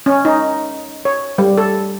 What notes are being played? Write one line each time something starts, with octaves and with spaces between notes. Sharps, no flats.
C#4
D#4
C#5
G3
A4